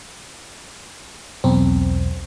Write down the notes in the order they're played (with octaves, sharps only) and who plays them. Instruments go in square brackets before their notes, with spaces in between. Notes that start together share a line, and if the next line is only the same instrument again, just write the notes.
[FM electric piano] B1 E2 C4